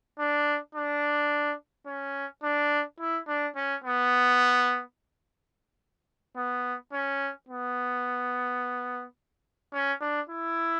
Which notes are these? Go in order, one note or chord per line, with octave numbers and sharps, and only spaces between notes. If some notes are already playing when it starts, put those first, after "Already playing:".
D4
D4
C#4
D4
E4
D4
C#4
B3
B3
C#4
B3
C#4
D4
E4